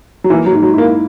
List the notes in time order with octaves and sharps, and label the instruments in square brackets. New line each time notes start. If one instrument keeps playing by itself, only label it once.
[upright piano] F#3
[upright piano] E3 [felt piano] A#3
[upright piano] F#3
[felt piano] G#2
[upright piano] F#3
[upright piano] A#3 [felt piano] E4